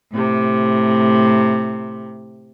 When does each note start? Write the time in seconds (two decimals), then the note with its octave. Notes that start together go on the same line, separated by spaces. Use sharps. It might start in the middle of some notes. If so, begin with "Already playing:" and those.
0.11 A2 C3